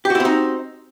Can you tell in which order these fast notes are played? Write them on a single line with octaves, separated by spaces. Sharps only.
G4 F#4 E4 C4 D#4